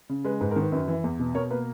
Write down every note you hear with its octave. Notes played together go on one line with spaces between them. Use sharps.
C#3
G#3 B4
G#2 B4
A#4
D#3
B4
F#2 B4
E3
E2
B2
B2 A#4 C#5
A#3 B4